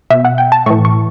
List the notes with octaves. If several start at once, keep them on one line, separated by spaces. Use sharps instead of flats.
B2 E5
F#5
G5
A5
A2 E3 C#6
C#6